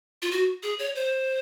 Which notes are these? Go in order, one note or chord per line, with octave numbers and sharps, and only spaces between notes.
F4
F#4
G#4
C#5
C5